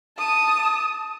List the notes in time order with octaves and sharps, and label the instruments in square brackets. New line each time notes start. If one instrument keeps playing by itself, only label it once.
[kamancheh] A5 D#6